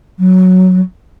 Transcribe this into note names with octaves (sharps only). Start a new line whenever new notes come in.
F#3